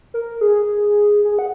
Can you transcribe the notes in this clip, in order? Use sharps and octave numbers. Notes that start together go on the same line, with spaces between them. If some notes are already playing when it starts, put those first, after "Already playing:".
A#4
G#4
G#4
F#5